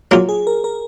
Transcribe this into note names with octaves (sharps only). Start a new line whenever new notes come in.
F#3 A#3 F4 G#4
G#4
A#4
A#4